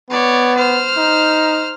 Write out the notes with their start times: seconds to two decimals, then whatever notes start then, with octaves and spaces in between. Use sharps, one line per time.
0.10 B3 C#5 D5
0.57 C5 F6
0.97 D#4